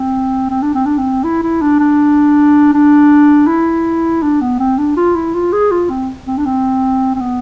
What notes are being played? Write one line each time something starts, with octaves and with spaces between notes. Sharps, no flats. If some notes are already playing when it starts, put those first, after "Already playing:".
Already playing: C4
C4
D4
C4
D4
C4
E4
E4
D4
D4
D4
E4
D4
B3
C4
D4
F4
E4
F4
G#4
F4
C4
C4
D4
C4
C4
B3